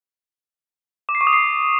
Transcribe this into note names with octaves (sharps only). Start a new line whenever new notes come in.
D6
C7
C#6
D#6
C7